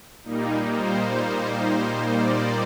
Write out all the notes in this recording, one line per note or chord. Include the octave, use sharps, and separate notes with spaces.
A#2 G3 A#3 D#4
C5
D5